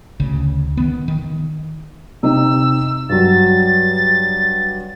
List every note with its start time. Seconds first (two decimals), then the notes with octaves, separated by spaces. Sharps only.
0.20 D2 C#3
0.77 D#3 B3
1.08 D#3
2.23 C3 D#4 D#5 E6
3.09 G2 F#3 A6